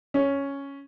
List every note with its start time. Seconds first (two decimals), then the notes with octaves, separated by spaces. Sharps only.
0.14 C#4